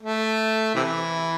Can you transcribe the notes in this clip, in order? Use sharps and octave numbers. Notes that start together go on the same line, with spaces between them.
A3
C3 E3